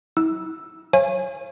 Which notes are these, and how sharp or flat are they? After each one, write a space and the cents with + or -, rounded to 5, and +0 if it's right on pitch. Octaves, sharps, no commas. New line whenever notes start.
E4 -40 E6 +0
C#5 -35 F5 -40 G#5 +0